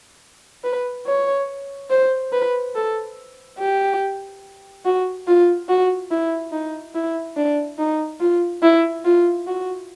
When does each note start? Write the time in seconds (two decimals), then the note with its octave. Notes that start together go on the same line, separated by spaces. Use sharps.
0.64 B4
1.07 C#5
1.90 C5
2.32 B4
2.75 A4
3.58 G4
4.85 F#4
5.27 F4
5.69 F#4
6.11 E4
6.52 D#4
6.95 E4
7.36 D4
7.78 D#4
8.20 F4
8.62 E4
9.05 F4
9.47 F#4